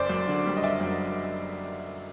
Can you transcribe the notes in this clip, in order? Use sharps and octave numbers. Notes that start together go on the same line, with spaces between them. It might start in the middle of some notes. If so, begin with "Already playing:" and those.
Already playing: F#1 C5 D5
F#2
D3
G3
D#5
F#1 D5 E5
F#2